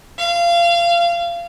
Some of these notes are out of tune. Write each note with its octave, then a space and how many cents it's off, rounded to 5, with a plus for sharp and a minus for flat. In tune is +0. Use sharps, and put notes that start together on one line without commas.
F5 -25